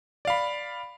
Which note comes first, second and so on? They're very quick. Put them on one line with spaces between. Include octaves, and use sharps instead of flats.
D5 F5 B5